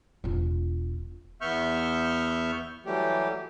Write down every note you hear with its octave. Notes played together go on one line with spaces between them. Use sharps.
E1 F4
E2 B3 E5 C#6 F6 G6
E3 F#3 G3 A3 G4